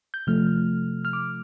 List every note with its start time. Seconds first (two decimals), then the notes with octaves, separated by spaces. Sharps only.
0.14 G6
0.27 C3 F3 A3 F6
1.05 F6
1.13 D6